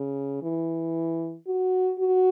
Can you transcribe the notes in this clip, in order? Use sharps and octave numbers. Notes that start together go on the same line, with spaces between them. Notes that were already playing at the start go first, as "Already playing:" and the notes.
Already playing: C#3
E3
F#4
F#4